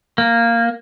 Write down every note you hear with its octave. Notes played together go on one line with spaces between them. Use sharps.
A#3